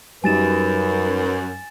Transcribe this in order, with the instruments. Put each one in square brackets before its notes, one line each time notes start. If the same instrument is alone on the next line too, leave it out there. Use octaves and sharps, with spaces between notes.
[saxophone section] F#2 [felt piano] G3 D#4 [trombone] B4 [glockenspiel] G#5 A6 E7